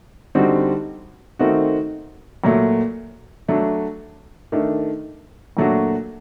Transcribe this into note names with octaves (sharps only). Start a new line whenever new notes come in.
D3 G3 C4 D#4 F#4
D#3 A3 C4 D#4 F#4
A#2 F#3 A3
F#3 A3 D4
D#3 A3 D4
A#2 F#3 A3 D4 F#4